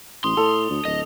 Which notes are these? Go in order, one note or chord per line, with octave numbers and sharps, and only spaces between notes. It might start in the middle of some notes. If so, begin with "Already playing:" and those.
A1 C6 D#6 G7
A2 A4 F7
D2
D1 D#5